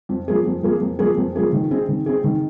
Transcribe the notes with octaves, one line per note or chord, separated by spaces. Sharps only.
F2
F3 A#3 G#4
F2
F3 A#3 G#4
F2
F3 A#3 G#4
F2
F3 A#3 G#4
D#3
C4 G#4
D#3
C4 G#4
D#3